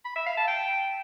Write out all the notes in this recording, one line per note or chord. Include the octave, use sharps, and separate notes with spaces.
B5
E5
F5
A5
G5